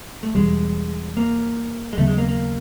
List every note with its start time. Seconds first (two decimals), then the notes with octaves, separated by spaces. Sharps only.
0.23 A3
0.35 E2 B2 G3 G#3
1.17 A#3
1.93 G#3
1.98 D#2 C#3 F#3 A3 B3
2.08 G#3
2.18 A#3
2.28 A#3